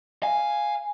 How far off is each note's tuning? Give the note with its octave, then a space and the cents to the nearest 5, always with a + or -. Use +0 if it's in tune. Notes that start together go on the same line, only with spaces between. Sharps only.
F5 +0 G#5 +0